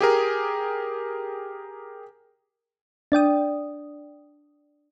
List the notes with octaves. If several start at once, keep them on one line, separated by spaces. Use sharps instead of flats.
G4 G#4 A#4
D4 D5 G5 D#6